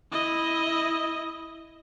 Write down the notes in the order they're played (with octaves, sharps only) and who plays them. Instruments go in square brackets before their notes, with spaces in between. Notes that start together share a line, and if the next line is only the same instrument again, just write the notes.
[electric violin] E4 D#5